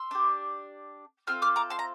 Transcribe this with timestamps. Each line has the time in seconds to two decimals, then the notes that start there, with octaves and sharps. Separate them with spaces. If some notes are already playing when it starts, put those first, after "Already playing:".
Already playing: C6 E6
0.11 D4 G4
1.27 C4 F4 A4 F6
1.42 D6 F6
1.56 A#5 D6
1.70 A5 C6
1.79 A#5